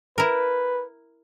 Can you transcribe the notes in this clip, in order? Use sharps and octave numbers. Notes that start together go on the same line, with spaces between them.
E4 A#4 B4